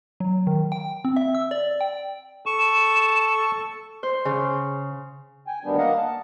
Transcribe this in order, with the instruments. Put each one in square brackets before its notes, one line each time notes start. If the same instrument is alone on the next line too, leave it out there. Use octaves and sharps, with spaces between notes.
[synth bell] F#3
D#3
G5
C4
E5
E6
D5
G5
[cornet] A4 [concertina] C#6 [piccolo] E7
[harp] C5
C#3
[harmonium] G5 G#5
D2 G2 D#3 G3 B3 D4
A#3 D#5 F5 F#5 A#5
A5